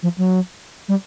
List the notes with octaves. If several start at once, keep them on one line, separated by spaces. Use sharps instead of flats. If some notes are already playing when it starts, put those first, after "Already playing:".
F3
F#3
G3